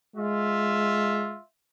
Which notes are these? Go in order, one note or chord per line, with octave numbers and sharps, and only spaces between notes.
G#3 F4 E5